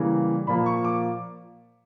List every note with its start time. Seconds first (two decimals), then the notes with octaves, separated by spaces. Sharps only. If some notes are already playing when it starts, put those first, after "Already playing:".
Already playing: C#3 E3 G3 A#3
0.47 A#2 F3 A#3 B5
0.66 C#6
0.84 D6